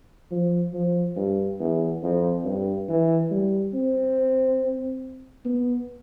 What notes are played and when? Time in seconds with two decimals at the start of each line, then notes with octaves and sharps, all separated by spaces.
0.31 F3
0.73 F3
1.16 G2
1.60 E2
2.03 F2
2.45 G2
2.88 E3
3.31 G3
3.74 C4
5.45 B3